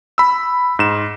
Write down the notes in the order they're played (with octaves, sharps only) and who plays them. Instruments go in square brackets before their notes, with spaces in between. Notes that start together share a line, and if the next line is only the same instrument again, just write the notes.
[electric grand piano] B5 E6
G#2 E7